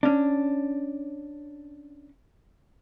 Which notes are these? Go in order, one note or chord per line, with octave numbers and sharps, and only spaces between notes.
C#4 D4